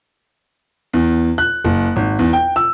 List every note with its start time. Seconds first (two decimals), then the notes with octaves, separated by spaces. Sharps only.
0.93 E2
1.38 F#6
1.65 F#1
1.96 G#1
2.19 E2
2.33 G5
2.56 E6